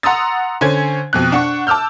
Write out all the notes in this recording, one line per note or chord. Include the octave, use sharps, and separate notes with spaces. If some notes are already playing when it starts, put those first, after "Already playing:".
F#5 A#5 C6 D#6 E6 A6
D3 C#4 C5 G#5 G#6
F2 B2 F#6
D4 F#5 C#6
A5 D6 E6 F6 G6